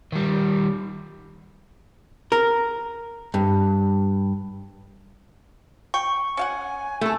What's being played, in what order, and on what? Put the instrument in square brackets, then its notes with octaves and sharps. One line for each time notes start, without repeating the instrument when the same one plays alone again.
[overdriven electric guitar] D#3 G3
[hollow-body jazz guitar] A#4
G2
[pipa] G5 [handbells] C#6
[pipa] C#4 F5 F#5 [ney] G#5
[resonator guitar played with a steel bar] A3 A4 [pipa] E4